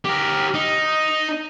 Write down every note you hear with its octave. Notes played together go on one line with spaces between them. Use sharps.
G4 A#4
D#4